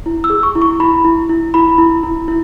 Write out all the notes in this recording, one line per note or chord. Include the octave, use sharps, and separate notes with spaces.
E4
E6
G#4
C#6
E4
C#6
E4 B5
E4
E4
E4 B5
E4
E4
E4